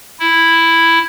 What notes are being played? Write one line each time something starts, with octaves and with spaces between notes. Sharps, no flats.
E4